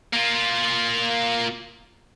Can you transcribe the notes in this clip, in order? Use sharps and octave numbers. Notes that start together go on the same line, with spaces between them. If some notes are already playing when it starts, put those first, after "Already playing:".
A#3 F4